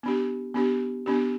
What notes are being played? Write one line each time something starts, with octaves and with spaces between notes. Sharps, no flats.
B3 D4 G4
B3 D4 G4
B3 D4 G4